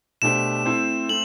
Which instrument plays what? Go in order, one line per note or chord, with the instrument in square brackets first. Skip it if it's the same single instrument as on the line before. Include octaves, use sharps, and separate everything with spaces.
[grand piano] B2 A3 D4 G4 C5 [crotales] E7
[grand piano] A3 C4 E4 A4 C5
[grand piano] A3 C4 [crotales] F#7